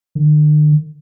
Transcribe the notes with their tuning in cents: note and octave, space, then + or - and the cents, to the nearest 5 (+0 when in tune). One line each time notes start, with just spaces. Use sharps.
D3 +45